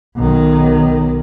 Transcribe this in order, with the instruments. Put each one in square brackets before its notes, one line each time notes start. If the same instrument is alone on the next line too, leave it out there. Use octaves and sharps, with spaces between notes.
[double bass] B1 D#3